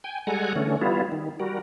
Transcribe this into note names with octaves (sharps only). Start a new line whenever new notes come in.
G5 G#5
G3 G#3 A4 F#5 G#5 A#5
D3 E3 A3 C#4
G3 B3 E4 F4
D#3
G3 F#4 A#4